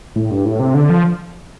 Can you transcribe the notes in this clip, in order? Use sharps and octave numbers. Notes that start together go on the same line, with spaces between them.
A2
G2
A2
C3
D3
F3